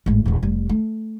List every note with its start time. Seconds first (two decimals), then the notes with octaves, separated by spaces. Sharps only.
0.06 G#1 A2
0.26 D#1 E2
0.43 F1 G3
0.69 A3